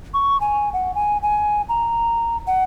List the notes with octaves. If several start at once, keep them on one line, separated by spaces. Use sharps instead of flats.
C#6
G#5
F#5
G#5
G#5
A#5
F#5